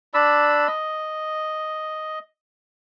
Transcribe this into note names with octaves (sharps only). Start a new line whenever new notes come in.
D4 D5 B5 E6
D#5